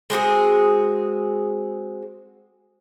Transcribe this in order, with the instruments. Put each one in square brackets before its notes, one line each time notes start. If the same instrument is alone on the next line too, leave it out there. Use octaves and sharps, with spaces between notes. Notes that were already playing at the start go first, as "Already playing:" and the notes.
[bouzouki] G#3 C4 F#4 G#4